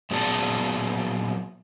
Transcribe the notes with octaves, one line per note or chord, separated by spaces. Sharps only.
A#2 F#3 B3 G#4 D5 A5